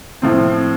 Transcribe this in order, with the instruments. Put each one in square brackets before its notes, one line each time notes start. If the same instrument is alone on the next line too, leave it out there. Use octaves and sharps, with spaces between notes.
[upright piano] A2 F3 C4